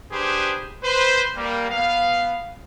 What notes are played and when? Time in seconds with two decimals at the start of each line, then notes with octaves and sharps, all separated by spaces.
0.12 D4 G4 G#4 B4 C5
0.83 B4 C5
1.36 G3 A#3
1.70 B3 F5